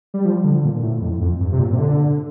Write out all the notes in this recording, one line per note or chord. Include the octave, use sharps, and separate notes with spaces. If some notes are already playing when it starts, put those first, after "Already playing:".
G3
F3
D3
A#2
A2
F2
F2
G2
C3
A#2
C3
D3